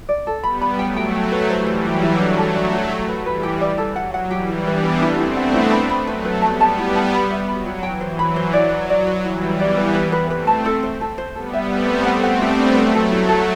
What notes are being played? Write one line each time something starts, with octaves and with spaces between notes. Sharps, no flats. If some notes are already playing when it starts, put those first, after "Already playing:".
D5
A4
G3 B3 B5
B5
F#3 A3 G5
G5
G5
B4
E3 G3 C5
C5
F#3 G4
E4
F#3 A3 D4
A4
F#3 A3 D4
F#4
G4
B4
E3 G3 B4
G4
D5
A4
F#3 F#5
F#5
E3 G3 G4
E4
B3 D4 B4
B4
A3 C4 E4
E4
B3 D4 F#5
E4
B5
B5
F#3 A3 B4
B4
G3 B3 A5
A5
E4
A5
B5
E5
F#3 B5
F#4
E3 G5
C5
F#3 B5
C5
F#3 D5
B4
D5
B4
E3 G3 E4
E4
G3 B3 D5
B4
B4
B4
A3 C4 B4
A5
A4
C5
A4
C5
G3 B3 A4
E5
A3 C4 E5
E5
A3 C4 F#5
F#5
G3 B3 G4
D4
F#3 A3 C5
A4
E4
A4